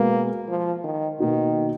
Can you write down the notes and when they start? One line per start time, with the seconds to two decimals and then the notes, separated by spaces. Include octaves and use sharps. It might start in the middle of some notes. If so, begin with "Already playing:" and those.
Already playing: B2 G#3 A#3 B3
0.48 F3
0.84 D#3
1.19 B2 D#3 A#3 D#4 F#4